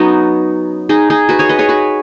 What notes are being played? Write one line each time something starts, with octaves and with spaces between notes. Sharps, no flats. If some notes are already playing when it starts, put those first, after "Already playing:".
Already playing: F#3 B3 C#4 D#4 F#4
D#4 G#4
D#4 G#4
F#4 B4
G#4 C#5
B4 D#5
G#4 C#5
F#4 B4